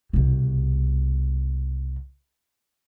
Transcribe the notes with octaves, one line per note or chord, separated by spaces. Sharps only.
C2 B2